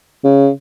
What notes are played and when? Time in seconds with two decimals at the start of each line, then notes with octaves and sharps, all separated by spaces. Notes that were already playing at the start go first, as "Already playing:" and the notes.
0.24 C#3